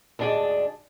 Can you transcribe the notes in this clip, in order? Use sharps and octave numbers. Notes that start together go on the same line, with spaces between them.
D2 G#2 D4 G#4 D5 A5